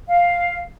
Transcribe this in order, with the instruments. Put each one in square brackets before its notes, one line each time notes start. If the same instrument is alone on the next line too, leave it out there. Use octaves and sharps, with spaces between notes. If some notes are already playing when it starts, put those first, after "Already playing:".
[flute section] F5